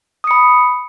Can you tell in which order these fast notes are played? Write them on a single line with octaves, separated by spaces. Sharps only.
D#6 C#7 B5